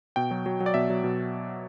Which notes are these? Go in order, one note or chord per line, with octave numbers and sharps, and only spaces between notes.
B2 G5
F#3
F#3
F#3
D5
B2 E5
F#3
B2